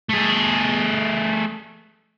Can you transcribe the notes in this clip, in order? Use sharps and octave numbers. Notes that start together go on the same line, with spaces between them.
A3 G#4